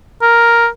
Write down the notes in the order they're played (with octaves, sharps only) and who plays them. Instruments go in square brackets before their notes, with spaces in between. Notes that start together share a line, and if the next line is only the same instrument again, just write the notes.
[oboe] A#4